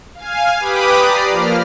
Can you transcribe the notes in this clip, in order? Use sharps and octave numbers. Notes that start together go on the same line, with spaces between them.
F5 G#5
G4 B4 B5 D6 D#6
D5 A#5 C7
F3 A#3 F6